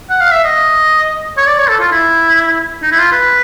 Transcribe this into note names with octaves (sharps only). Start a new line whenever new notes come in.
F#5
F5
E5
D#5
C#5
D5
C#5
A4
F4
E4
D#4
E4
F4
B4